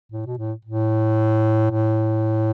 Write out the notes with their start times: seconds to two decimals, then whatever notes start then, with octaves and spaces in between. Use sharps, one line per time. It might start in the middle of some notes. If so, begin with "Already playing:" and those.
0.12 A2
0.26 B2
0.38 A2
0.65 A2
1.71 A2